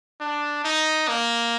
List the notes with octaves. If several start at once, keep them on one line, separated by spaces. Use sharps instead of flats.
D4
D#4
A#3